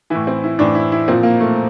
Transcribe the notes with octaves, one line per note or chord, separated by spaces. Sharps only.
A2 E3 E4
C4
E4
A2 E3 D4
E4
E4
A#2 F3 C4
A#3
A3